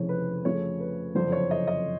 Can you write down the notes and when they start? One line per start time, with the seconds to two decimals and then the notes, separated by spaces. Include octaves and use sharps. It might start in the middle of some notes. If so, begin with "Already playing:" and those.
Already playing: F1 F2 C#3 E3 C#5
0.09 B4
0.44 F2 C#3 F3 A3 C#5
0.80 B4
1.15 F#1 F2 D3 F3 C5
1.32 C#5
1.51 D#5
1.67 D#5